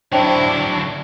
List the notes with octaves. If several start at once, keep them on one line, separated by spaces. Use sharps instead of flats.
D3 F#3 D4 E4 C5 G5 A5